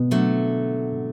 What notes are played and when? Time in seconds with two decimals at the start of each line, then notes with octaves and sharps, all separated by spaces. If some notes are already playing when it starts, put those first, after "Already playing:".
Already playing: B2 B3
0.11 D3 F#3 A3